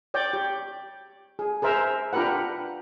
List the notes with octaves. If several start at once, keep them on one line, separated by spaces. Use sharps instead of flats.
C#5 D5 G5
G4
G#4
G#4 A#4 C5 E5
D4 F4 G4 A#4 B4 F#5